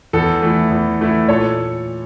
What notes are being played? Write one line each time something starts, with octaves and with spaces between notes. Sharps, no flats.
E2 A4
E3 A3 E4
E2
E3 A3 E4
A#2 A4 C#5